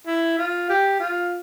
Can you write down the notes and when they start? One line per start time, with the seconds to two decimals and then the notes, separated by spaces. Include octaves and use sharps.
0.07 E4
0.38 F4
0.69 G4
1.00 F4